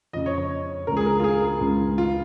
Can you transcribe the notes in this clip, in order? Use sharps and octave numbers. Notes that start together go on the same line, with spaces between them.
F2 C#3 D#5
C#5
C#5
C#2 C#3 A#4
G#4
A#4
F4
G#4
C#2 C#3
F4